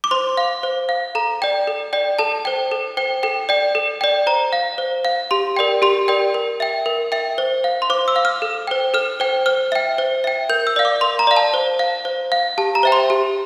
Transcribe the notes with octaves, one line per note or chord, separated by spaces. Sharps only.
D6
C5 C6
F5
C5
F5
A4 A#5
D5 G5
A4
D5 G5
A4 A5
C5 G5
A4
C5 G5
A4 G5
D5 G5
A4
D5 G5
C5 A#5
F5
C5
F5
G4 C6
A#4 D5 G5
G4 C6
A#4 D5 G5
A#4
E5 G5
A#4
E5 G5
C5
F5
C6
C5 D6
E6
F5
F6
A4
C5 G5
A4 F6
C5 G5
C5 F6
E5 G5
C5
E5 G5
A#4 G6
E6
D5 F5
D6
A#4 C6
A#5
D5 F5
A5
C5
F5
C5
F5
G4 A5
A#5
C5 E5 G5
C6
G4